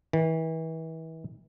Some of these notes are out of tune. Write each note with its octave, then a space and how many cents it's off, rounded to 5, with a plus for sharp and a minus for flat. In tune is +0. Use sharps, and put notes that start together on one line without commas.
E3 -35